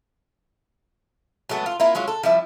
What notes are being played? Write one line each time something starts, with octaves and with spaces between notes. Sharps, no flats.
F#3 G#3 A3 B3
F4
A#3 E4 F4
F#3 G#3 C#4 F4
A4
F3 G3 E4